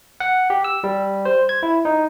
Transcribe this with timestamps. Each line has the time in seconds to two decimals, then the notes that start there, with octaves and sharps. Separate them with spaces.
0.20 F#5
0.50 G4
0.64 E6
0.84 G3
1.25 C5
1.49 G#6
1.63 E4
1.85 D#4